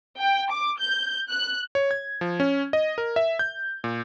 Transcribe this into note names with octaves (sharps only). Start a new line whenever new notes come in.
G5
D6
G6
F#6
C#5
G#6
F3
C#4
D#5
A#4
E5
G6
A#2